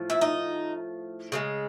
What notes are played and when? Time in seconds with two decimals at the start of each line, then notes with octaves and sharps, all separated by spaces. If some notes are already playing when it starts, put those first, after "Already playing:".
Already playing: A2 F3
0.10 E4
0.21 D#4
1.32 C#3 F3 G#3